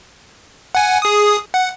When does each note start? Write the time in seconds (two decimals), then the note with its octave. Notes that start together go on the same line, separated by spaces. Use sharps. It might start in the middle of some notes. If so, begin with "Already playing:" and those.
0.75 F#5 G#5
1.02 G#4 D#6
1.54 F#5